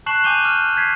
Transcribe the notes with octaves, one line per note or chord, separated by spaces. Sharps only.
A5 C#6 F#6 C7 E7 F#7
G#5 D6 G6 D#7 F7 G7
F6
G6 G#6 B6 C7